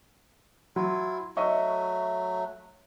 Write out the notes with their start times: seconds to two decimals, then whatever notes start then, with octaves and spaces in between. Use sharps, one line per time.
0.76 F#3 E4 F4
1.37 F#3 A3 D#5 E5 C#6